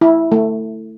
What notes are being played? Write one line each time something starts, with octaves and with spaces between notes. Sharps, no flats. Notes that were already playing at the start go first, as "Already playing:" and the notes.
E4
A3